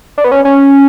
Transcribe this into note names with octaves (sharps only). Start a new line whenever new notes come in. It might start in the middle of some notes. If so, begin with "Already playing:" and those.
D4
B3
C#4
C#4